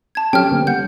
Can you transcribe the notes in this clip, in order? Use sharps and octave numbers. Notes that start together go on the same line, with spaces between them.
A5 G#6
F#3 C4 C#4 G4 A4 G5 F6
D3 A#3 B3
G3 F#5 G6